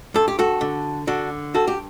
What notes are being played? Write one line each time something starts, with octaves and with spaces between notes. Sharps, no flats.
G2 A4
G4
F#4 A4
D3
D3 D4 F#4
G2 F#4 A4
G4